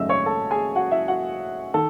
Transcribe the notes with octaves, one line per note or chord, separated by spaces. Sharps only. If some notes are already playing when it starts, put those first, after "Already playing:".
Already playing: G#1 F#2 C#3 F#3 A3 D#5 E5 E6
C#5 C#6
A4 A5
G#4 G#5
F#4 F#5
E4 E5
F#4 F#5
D#3 A4 A5